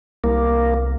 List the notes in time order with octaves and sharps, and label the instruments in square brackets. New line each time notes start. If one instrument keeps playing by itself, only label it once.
[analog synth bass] C2 [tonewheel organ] A#3